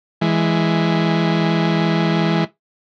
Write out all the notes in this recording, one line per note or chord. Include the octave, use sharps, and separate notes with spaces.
E3 G#3